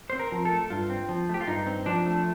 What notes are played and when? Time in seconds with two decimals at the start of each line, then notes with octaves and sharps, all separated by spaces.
0.10 C4 C5
0.19 A#4
0.32 F3
0.45 A4
0.51 A3
0.70 G2 F4
0.90 C4
1.09 F3
1.29 A3 G4
1.41 F4
1.48 G2 D#4
1.67 C4
1.86 F3 D4
2.06 A3